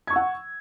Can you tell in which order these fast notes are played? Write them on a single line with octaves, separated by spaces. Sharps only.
G#6 C#6 E6 F#5